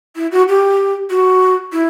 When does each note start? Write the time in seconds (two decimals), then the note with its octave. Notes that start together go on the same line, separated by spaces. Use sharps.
0.16 E4
0.32 F#4
0.48 G4
1.10 F#4
1.72 E4